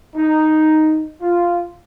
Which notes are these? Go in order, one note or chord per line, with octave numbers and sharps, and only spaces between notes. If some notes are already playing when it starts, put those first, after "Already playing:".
D#4
F4